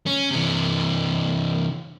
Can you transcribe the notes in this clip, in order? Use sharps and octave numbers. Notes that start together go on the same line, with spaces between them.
C#4
C3 E3